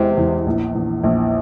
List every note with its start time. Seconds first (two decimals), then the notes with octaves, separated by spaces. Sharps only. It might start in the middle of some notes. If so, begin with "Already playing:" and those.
Already playing: E2 C3 G#3
0.17 E2
0.46 A#1
0.75 A#1
1.04 A#1